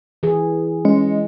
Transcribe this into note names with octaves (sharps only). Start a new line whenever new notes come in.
E3 G#4
G#3 C#4